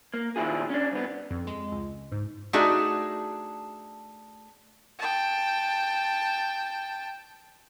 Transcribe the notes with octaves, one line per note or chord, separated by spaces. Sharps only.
A#3
A#2 D#3 E4 F4 G#4
C#4 D4
C2 B3
F2
G#3
C#2
G#2
A3 D4 D#4 F#4 G#4
G5 A5